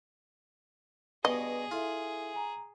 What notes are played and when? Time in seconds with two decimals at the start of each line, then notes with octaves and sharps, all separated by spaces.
1.25 G2 B2 G#4 D#5
1.71 E4 F4 A4 E5
2.34 G#5 A#5